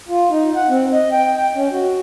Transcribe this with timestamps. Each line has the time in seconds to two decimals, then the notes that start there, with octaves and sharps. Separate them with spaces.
0.09 F4
0.30 D#4
0.56 F#5
0.69 C4
0.92 D#5
1.12 G5
1.37 G5
1.55 C#4
1.72 F#4